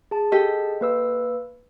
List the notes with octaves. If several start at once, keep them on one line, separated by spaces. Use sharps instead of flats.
G#4 A5
G4 A4 D#5
A#3 B4 E6